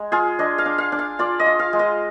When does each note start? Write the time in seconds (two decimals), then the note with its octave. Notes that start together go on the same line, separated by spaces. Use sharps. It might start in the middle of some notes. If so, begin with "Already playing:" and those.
Already playing: G#3
0.12 F4 G#4
0.39 D4 D#5
0.58 F5
0.66 D4
0.78 F5
0.92 D4
0.99 F5
1.19 F4 D5
1.39 D#5
1.46 F4
1.59 F5
1.73 G#3
1.79 D#5